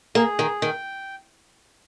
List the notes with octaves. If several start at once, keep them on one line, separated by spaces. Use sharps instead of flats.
A#3 G#4
D#3
D#3 G5